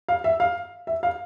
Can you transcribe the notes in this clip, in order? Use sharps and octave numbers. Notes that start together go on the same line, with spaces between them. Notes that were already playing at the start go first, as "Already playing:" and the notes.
F5
E5
F5
E5
F5